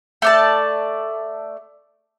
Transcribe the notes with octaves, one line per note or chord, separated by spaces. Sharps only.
A3 D5 A5